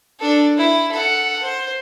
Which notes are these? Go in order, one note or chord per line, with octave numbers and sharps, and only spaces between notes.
D4 A4
E4
A4 F#5
C5